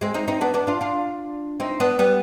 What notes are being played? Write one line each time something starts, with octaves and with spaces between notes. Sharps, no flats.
G#3 C4
C4 D#4
C4 D#4
B3 D4
B3 D4
D4 F4
D4 F4
C4 D#4
B3 D4
G3 B3